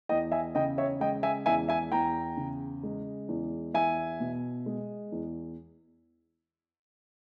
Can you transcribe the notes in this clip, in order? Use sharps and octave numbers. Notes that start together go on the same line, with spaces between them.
E2 D#5 G5
E5 G#5
C#3 D#5 G5
C#5 E5
G#3 D#5 G5
E5 G#5
E2 E5 G#5
E5 G#5
E2 G5 A#5
C#3
G#3
E2
E2 E5 G#5
B2
G#3
E2